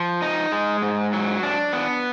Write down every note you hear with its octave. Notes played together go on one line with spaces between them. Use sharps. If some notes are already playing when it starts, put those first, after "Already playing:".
Already playing: F3
D#4
G#3
G#2
F#3
D4
B3